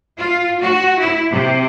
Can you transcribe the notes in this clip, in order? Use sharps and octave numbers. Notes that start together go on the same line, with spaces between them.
F4
F#4
E4
C3